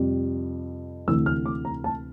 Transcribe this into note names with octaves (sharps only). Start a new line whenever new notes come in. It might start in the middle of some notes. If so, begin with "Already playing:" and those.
Already playing: F2 C3 G3
D2 C3 E3 E6
F6
D6
A#5
A5